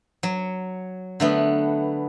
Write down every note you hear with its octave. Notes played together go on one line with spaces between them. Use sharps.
F#3
D3 A3 B3